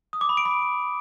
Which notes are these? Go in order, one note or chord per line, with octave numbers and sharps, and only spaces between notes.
D#6
D6
B5
D7
B5